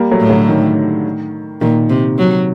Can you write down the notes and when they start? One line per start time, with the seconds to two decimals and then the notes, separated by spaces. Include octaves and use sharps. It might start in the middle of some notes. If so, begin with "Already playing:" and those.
Already playing: G3 A#3
0.11 F#3 A3
0.20 A2
0.29 D3 F#3
0.48 D#3
1.61 A#2 D#3
1.90 C3
2.18 F#3